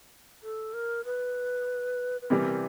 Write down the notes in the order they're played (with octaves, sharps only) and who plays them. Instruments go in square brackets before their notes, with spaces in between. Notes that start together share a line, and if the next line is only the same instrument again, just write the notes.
[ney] A4
A#4
B4
B4
[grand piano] C3 E3 G3 [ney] A#4